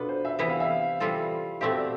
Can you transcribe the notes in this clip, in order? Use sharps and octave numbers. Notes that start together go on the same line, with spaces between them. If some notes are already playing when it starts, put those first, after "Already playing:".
Already playing: B2 B3 D4 F4 A4 B4
C5
E5
C3 E3 B3 E4
F5
E5
F5
E3 G3 C4 F4 A4
B2 A3 C4 G4 E5
D5